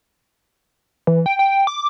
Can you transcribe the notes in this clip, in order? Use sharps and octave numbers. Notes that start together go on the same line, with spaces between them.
E3
G5
G5
D6